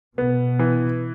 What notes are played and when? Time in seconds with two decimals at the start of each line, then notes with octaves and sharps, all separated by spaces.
0.18 B2 B3
0.59 E3